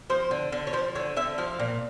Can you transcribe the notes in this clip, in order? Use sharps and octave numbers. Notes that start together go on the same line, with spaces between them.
F3 C5
D3
D3
C#5
F3 C5
D3 C#5
D3 E5
F3 F5
A#2